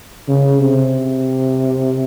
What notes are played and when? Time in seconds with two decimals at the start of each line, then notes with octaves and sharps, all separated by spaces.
0.28 C#3
0.61 C3